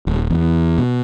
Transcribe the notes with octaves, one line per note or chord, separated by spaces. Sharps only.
D#1
E2
B2